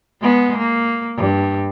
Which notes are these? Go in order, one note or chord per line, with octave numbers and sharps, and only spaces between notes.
G#3 B3
A#3
G2